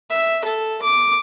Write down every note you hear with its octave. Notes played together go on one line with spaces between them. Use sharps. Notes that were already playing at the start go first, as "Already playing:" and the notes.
E5
A4
D6